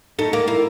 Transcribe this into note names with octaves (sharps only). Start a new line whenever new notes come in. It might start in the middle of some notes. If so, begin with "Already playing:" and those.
A3 D#4
A#3
A#3 E4